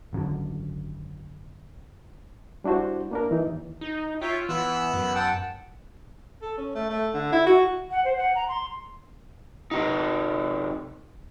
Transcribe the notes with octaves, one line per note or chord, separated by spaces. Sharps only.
G#1 F#2 A#2 D3
G3 D4 E4 F#4 C5
A#3 D4 A#4
E3 D#4
D#2
D#4
F4 C#5 E5 G5
E3 B3 E6 F#6
F#2
F#5 G5 A5
A4
C#4
A3
A3
D3
E4
F#4
F#5
C5
F#5
A#5
C6
C3 D#4